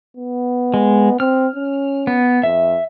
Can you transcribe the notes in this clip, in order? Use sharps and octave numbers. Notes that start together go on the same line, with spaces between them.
B3
G#3
C4 F6
C#4
B3
F2 E5